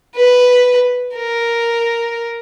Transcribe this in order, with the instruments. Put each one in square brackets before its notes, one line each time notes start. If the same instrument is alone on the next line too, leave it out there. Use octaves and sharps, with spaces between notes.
[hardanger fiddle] B4
A#4